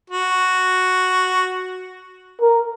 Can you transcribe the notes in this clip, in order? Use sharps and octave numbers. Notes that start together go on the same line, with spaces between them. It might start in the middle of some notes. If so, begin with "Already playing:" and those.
F#4
A#4